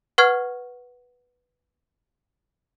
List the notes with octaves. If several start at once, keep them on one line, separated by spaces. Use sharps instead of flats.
B4 F#5 C#6 F6 G#6